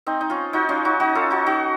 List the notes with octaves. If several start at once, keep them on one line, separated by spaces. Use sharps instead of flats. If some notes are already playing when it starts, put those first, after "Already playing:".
C4 D#4
D#4
C#4 F4
D#4 F#4
C#4 F4
D#4 F#4
D#4 F#4
F4 A4
D#4 F#4
D#4 F#4